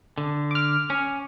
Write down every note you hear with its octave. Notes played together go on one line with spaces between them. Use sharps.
D3
D6 F6
C#4